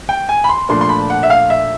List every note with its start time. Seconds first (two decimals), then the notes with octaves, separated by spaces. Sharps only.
0.09 G5
0.29 G#5
0.44 B5
0.49 C6
0.69 A#2 F3 A3 D4 C6
0.81 C6
0.89 B5
1.10 F#5
1.23 E5
1.30 F5
1.50 E5